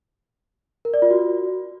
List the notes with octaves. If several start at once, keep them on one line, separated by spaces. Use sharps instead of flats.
A#4
D5
F4
F#4